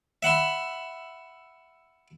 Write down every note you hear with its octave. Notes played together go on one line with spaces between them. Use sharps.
E5 F#5 B5 C6